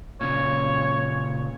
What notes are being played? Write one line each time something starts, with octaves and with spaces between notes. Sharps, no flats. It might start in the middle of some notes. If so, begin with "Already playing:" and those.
A#2 C#3 C#5